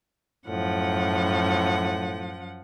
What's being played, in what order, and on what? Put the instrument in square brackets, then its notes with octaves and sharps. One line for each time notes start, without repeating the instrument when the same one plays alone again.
[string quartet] F#2 F3 F#5 [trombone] A2